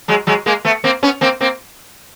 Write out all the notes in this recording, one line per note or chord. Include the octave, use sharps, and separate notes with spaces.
F#3 G#3
F#3 G#3
G#3 A#3
A3 B3
A#3 C4
B3 C#4
A#3 C4
A#3 C4